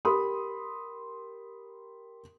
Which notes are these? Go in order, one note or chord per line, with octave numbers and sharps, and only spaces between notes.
G4 A#4 B5 C6 D#6